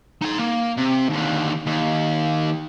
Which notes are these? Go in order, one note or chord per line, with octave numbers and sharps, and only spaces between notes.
D#4 C6
A#3
C3
D#2 D3
D#2